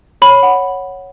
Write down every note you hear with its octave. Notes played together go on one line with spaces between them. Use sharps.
C#5 B5
F#5